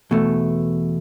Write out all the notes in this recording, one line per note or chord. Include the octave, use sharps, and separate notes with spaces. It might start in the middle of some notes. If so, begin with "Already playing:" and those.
E2 B2 A3